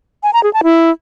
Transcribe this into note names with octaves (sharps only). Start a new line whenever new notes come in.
G#5
A#5
G#4
A5
E4